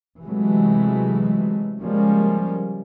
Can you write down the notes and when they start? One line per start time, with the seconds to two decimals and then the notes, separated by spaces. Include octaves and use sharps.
0.22 C3 E3 F#3 G#3 A3
1.80 C#3 F3 G3 G#3 A#3 C#4